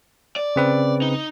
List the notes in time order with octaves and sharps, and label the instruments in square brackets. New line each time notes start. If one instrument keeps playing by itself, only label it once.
[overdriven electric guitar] D5
[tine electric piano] C#3 C4 B4
[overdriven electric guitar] D#4